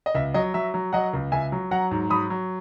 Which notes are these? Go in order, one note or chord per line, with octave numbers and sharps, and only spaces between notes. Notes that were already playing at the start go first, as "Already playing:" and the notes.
D#5
C#2 E5
F#3 D#5
F#3 E5
F#3
F#3 D#5 F#5
C#2
C#2 E5 G#5
F#3
F#3 F#5 A#5
G#2
F#3 B5 D#6
F#3